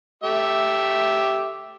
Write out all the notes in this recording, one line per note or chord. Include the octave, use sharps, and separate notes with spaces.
A3 G4 E5